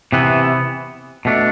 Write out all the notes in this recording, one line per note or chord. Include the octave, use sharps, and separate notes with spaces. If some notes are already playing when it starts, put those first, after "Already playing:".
C3 E3 B3
B2 A3 D4